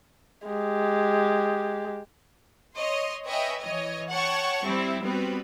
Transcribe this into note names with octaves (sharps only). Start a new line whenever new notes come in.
G#3 G4
C#5 D#5 C6
B4 C#5 D#5 E5 G5 G#5
E3 C#5 D#5
C#5 F#5 G5 A5 C#6
G3 C4 E4
G3 B3 C4 F#4 B4